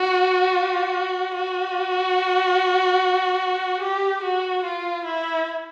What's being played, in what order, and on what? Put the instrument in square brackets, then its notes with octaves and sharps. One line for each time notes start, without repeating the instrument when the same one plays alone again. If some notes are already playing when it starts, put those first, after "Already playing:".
Already playing: [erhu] F#4
F#4
G4
F#4
F4
E4